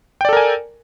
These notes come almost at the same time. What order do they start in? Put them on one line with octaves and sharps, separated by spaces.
G5 D5 A4 A#4 G#5